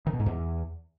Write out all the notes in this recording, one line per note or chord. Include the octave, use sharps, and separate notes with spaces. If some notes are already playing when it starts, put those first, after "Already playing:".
D#3
B2
G#2
E2